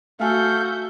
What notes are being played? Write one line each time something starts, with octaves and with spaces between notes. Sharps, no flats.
A3 F#4 A4 E5 F5 G#5 G6